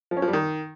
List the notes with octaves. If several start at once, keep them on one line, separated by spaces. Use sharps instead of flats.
F3
C#4
F3
G3
D#3